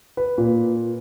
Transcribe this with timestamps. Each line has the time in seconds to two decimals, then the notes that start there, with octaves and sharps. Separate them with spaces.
0.17 B4
0.38 A#2